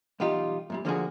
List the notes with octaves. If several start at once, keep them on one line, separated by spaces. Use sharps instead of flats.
B1 E2 G3 D#4 F4 G4
F#2 A#2 G3
D3 F3 A#3 B3 F#4 G#4